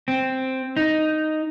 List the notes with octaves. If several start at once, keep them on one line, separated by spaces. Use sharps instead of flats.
C4
D#4